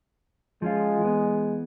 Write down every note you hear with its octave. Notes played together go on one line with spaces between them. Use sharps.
F3 G#3 C#4 F4
E3 B3